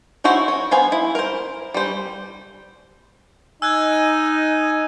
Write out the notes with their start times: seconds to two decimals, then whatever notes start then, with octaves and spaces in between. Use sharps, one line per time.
0.24 D#4 E4 F#4 C5 C#5
0.48 C#5
0.71 B3 C5 F5 G#5
0.92 E4
1.15 A#4 C5
1.74 G3 C5
3.62 D#4 G#5 E6 F#6 G#6
3.93 D#7